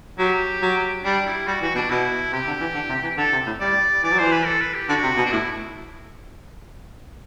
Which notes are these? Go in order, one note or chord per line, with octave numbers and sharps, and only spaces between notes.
F#3 G4
F#3
G3 D4
E4
G3 F#4
E3 F#4
B2 D4
B2 E4
C3 G4
D3
E3
D3
C3
E3
D3 A4
C3
A2
G3 D5
E3 D5
F#3
E3 C5
B4
A4
B4
G4
D3 F#4
C3
B2
D4
A2 E4